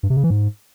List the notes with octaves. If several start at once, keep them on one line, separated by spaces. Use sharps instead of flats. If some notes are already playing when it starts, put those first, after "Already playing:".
G2
C3
C#3
E3
G#2